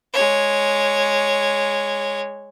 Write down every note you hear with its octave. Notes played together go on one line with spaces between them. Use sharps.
G#3 C#5